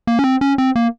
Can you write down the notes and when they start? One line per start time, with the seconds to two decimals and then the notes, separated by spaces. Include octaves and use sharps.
0.07 A#3
0.19 C#4
0.24 C4
0.41 C#4
0.58 C4
0.76 A#3